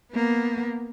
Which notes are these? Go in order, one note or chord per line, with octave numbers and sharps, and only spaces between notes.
A#3 B3